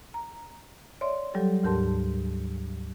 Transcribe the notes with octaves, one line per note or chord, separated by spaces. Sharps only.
A#5
C#5 D5 E5 C6
F#3 G3 G4 A4
D2 G#2 G4 A#4 A5 C6